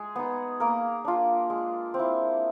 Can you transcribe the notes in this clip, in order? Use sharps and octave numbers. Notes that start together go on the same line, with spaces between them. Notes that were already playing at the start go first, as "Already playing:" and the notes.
Already playing: G#3 G#4
B3 D#4
A#3 A#4
D4 F4
G#3
C4
E4